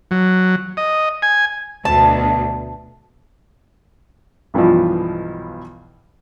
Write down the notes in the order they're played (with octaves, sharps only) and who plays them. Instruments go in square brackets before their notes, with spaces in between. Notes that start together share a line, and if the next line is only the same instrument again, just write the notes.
[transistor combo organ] F#3
D#5
G#5
[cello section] D2 B2 [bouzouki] A5
[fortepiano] B1 G2 B2 E3 F3